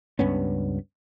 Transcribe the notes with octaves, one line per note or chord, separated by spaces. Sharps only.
C#2 G2 B3 C#4